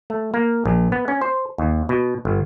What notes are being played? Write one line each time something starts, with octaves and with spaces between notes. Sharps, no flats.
A3
A#3
A#1
B3
C#4
C5
D#2
B2
G1